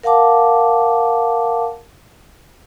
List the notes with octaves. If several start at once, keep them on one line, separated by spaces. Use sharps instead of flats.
A#4 F5 F#5 A5 D6